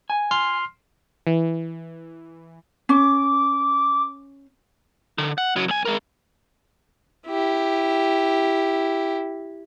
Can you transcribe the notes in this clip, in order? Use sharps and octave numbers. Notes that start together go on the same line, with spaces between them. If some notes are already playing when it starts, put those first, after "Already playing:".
G#5
C6 F6 C7
E3
C#4 D6
D3
F#5
C#3 F#3
B1 G#5
G#3 A#4
E4 G4